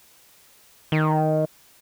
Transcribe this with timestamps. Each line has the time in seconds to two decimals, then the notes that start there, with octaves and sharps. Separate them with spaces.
0.92 D#3